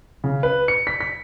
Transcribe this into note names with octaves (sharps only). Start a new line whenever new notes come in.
C#3
B4
C#7
B6
B6